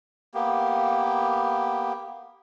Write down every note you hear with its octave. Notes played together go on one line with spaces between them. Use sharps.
A#3 B3 G4